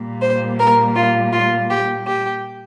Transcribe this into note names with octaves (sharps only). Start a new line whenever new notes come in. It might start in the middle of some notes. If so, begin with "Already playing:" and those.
Already playing: A#2 G3 A#3
C5
A#4
F4
F4
G4
G4